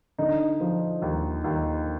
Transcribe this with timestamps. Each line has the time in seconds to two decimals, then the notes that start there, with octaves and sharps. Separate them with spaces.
0.18 D3 D#4
0.60 F3
1.02 D#2
1.44 D#2